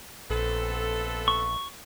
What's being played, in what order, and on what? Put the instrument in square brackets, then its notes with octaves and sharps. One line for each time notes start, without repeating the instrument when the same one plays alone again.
[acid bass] A#1 [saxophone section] B3 C4 A4
[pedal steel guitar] C#6